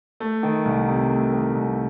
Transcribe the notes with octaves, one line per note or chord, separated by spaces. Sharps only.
A3
D#3
C2
C3
A3
D#3
C2